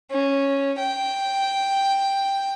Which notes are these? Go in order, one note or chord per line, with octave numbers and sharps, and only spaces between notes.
C#4
G5